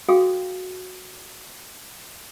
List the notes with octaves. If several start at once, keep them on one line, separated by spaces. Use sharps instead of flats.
F#4 G#4 A4 F5 G5 D#6